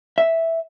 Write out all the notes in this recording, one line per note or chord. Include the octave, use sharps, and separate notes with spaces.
E5